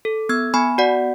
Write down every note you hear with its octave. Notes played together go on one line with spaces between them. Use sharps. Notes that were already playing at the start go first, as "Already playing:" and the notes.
A4
B3 E6 G#6
B3 G#5 B5
F#4 D5 F#5